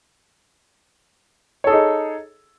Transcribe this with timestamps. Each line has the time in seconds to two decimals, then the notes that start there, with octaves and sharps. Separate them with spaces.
1.64 C#5
1.67 A4
1.70 G#4
1.73 D#4